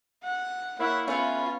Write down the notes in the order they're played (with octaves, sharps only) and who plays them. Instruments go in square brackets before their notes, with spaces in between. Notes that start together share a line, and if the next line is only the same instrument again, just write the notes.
[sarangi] F#5
[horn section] A#3 E4 [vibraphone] C#5 B5 C#6 [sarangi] F#5
[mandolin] A3 B4 [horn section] B3 C#4 [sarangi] F4